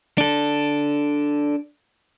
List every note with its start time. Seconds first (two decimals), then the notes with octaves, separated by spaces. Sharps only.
0.18 D4 A4